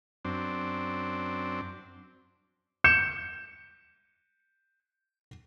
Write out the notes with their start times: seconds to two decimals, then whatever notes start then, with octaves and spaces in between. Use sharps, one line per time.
0.25 F#2 C4 D4
2.84 G6 C#7 E7